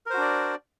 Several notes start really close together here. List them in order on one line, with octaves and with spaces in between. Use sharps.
A#4 C5 F#4 D4 D5